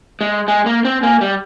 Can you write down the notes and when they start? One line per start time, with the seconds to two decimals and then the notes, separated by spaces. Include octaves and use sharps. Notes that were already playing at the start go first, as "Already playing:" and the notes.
0.21 G#3
0.48 G#3 G#5
0.66 A#3
0.85 C4
1.02 A#3 G#5
1.21 G3